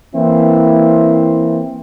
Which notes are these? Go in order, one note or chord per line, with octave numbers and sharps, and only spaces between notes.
E3 A#3 C4 E4